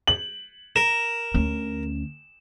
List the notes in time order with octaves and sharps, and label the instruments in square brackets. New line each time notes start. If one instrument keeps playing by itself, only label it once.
[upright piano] F#7
[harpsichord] A#4 [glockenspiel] E7
[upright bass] D2 C#4